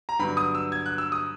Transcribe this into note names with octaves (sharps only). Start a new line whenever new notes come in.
A#5
G2 D3 F#3 B3 B5
D#6
E6
G#6
F#6
E6
D#6